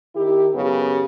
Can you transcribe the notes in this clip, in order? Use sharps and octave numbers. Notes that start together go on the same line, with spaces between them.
D#3 E4 G4
F#2 C#3 B3 G4